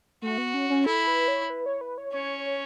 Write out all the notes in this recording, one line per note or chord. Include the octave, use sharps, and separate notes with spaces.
A3 F#4
B3
C#4
C#4
E4 A4
B4
C#5
B4
C#5
B4
C#5
C#4 C#5
C#5